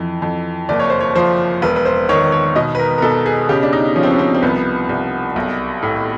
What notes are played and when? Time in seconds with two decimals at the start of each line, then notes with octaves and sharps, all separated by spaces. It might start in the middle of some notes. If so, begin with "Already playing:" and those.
Already playing: F2 E3
0.22 F2
0.69 F#1 D5
0.80 C#5
0.90 C5
1.00 C#5
1.15 F3 C5
1.62 E1 B4
1.76 B4
1.85 C5
2.09 D#3 C#5
2.32 C#5
2.56 B2 D#5
2.75 B4
2.79 A#4
2.98 A#4
3.02 B2 A4
3.26 G#4
3.49 C#3 G4
3.63 D4
3.73 D#4
3.96 F3 C#4
4.03 C4
4.11 C#4
4.19 C4
4.35 C4
4.42 C2 B3
4.89 C2
5.36 B1
5.83 A2